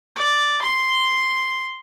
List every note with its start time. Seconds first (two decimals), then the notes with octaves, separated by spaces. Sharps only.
0.16 D5
0.62 C6